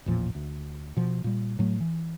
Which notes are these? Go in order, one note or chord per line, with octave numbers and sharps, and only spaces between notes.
A1 E2 A#2 F3
D2
B2 F3
A#2 G3
A2 F#3 A3
E3